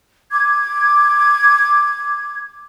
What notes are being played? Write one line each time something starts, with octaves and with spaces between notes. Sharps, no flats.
D6 G#6